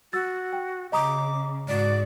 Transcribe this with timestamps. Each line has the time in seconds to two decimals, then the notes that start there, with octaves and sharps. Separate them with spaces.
0.13 F#4 E6 A6
0.53 G5
0.92 C#3 D#5 A#5 D6 D#6
1.68 G#2 F#4 D5